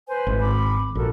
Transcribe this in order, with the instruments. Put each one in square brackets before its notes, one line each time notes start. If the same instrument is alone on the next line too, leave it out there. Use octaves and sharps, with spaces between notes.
[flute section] B4 C5 G#5
[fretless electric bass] G#1
[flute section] B5 D6
[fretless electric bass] A#1 [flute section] F#4 A4 A#4